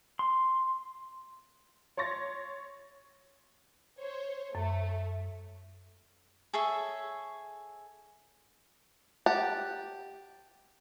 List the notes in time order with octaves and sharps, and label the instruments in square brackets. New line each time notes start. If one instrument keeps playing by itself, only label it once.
[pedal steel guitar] C6
[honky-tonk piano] C#5 C6 C#6 A6 A#6
[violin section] C5 C#5
[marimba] F#2 [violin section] A3
[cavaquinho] G#4 A4 C#5 E5
[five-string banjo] G4 F#5 A5